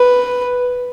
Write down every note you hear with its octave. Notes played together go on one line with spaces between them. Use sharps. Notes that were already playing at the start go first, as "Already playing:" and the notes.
Already playing: B4